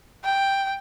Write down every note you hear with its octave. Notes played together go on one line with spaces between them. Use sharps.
G5